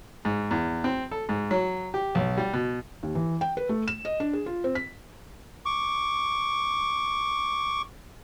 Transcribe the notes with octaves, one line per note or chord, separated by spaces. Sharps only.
G#2
E2
C4
A4
G#2
F#3
G4
B1
G3
B2
D#2
E3
G5
B4
A3
E7
D#5
D4
G#4
F4
C4
B6
C#6 D6